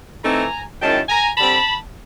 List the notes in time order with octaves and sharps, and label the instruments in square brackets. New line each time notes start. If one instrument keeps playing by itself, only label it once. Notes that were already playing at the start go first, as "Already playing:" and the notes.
[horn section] E3 A3 C4 D#4 G#5 A#5
F#2 D#3 G#3 C#4 E4 G5 A5
G#5 A#5
D3 G3 C4 A5 B5